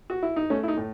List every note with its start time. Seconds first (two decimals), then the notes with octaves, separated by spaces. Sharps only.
0.10 F#4
0.23 E4
0.36 D#4
0.50 A3 C#4
0.63 E4
0.68 D#4
0.77 A2